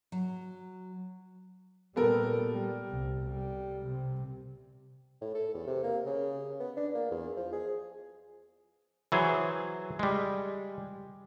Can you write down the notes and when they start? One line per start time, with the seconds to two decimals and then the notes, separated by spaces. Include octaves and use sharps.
0.12 F#3
1.96 A#2 G3 B3 A4 A#4
2.52 G3
2.90 C2
3.25 G3
3.86 C3
5.21 A2
5.35 A4
5.54 E2
5.67 C3
5.83 A#3
6.06 C#3
6.60 B3
6.77 D4
6.94 A#3
7.11 E2
7.37 F3
7.53 G#4
9.12 E3 F#3 G#4 C5
9.99 G3 G#3